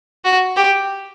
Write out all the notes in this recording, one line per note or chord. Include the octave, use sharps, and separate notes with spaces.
F#4
G4